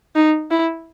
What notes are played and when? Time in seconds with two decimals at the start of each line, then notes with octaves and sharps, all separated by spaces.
0.16 D#4
0.51 E4